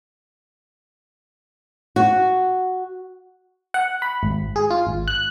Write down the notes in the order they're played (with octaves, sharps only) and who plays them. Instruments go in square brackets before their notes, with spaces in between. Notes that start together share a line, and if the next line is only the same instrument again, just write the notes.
[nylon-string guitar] F#4
[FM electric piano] F#5
B5
G#1
G#4
F4
G#1
F#6